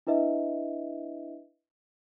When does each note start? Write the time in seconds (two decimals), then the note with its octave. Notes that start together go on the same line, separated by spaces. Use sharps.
0.07 D4 E4 B4 D#5 E5